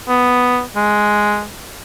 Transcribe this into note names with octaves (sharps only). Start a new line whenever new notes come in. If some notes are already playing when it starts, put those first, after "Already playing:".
B3
G#3